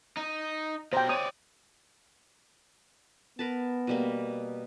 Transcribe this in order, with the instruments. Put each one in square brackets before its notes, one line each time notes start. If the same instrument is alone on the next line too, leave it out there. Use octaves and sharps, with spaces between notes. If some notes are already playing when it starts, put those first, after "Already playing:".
[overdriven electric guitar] D#4
[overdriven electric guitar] B2 A#5 [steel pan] C5 G5
[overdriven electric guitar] C#5 D5 [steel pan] D#6
[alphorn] B3 [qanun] A#4 B4 A5
[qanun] B2 G3 A#3